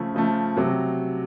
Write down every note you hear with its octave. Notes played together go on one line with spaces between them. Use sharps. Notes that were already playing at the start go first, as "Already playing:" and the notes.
Already playing: C#3 F3 A3
C#3 F3 A3
C3 F#3